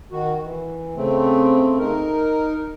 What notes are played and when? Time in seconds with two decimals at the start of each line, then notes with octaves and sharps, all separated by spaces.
0.12 D#3 F#4
0.44 E3
0.96 C#3 A3 C4
1.79 D#4 A#4